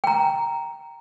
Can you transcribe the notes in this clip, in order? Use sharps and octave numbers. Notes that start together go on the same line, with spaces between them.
G5 A#5